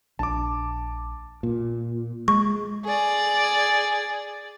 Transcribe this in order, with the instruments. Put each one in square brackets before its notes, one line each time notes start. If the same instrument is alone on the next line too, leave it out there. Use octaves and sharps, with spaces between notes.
[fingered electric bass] A#1 D4 [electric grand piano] A5 D6
[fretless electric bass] A#2
[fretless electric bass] G#3 [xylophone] C#6
[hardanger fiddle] G#4 D5